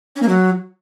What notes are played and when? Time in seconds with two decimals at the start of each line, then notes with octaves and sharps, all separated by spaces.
0.16 C#4
0.22 A#3
0.28 F#3